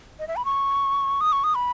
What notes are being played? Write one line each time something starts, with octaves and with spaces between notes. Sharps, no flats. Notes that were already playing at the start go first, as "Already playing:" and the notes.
D#5
E5
B5
C#6
D#6
C#6
D#6
B5